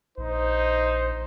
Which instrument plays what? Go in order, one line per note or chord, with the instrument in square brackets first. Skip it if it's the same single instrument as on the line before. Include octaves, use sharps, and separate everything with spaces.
[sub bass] A#1 [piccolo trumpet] D#4 [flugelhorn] C5